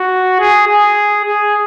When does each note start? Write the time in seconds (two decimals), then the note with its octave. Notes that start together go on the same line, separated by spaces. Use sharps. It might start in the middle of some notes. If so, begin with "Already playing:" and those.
Already playing: F#4
0.40 G#4
0.67 G#4
1.24 G#4